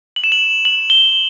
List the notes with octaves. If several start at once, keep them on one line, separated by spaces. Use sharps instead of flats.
F#7
E7
F#7
F#7
G7